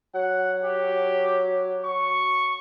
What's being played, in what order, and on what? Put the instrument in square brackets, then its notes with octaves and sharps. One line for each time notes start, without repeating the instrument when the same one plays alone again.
[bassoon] F#3 [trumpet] F#5
[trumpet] G4
C#6